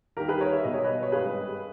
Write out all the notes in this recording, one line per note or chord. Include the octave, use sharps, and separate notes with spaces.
D#2 D#3 G3 G4 A#4
G#4 B4
A#4 C#5
E5
B1 B2 G3 D#5
C#5
B4 D#5
C#5
G#1 G2 G3 G#4 B4